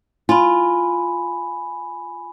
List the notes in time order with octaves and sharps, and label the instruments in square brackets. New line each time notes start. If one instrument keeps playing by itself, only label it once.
[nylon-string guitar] F4 [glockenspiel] G#5 B5